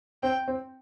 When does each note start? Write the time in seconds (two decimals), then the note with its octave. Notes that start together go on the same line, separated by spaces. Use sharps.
0.23 C4 G5
0.48 C4